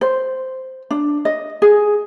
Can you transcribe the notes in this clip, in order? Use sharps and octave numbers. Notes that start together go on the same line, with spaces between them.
C5
D4
D#5
G#4